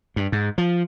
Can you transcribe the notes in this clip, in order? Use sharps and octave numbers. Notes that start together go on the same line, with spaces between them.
G2
G#2
F3